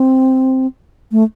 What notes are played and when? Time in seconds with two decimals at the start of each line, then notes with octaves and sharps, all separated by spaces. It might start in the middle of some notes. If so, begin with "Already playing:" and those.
Already playing: C4
1.12 A3